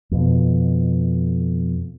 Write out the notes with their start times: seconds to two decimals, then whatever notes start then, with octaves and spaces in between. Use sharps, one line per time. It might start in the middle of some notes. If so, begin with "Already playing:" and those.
0.11 F2 B2